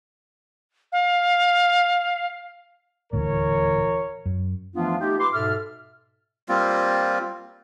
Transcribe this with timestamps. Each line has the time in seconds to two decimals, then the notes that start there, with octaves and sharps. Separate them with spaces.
0.92 F5
3.13 D#1 D2 A2 E3 A#4 C#5
4.26 F#2
4.74 E3 F3 A3 B3 D4 F4
5.00 A3 D#4 F4 G4
5.19 B4 C6 D6
5.33 G#2 B2 A4 E5 F6
6.49 G3 A#3 C4 F4